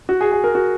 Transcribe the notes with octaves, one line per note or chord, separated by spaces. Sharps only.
F#4
G#4
G#4
A#4
F#4